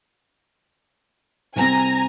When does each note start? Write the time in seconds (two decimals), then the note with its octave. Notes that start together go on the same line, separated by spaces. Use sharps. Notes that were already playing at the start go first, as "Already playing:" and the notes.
1.56 C2 C4 G#5 A#5